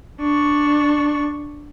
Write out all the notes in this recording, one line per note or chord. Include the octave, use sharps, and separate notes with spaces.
D4 C#6